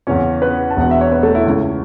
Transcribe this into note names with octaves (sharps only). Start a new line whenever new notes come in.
E2 C#3 E3 C#4 C#5
B3 B4
A5
E1 E2 B2 B3 F#5
E5
C#5
B3 B4
A3 A4
E4
C#2 C#3 A3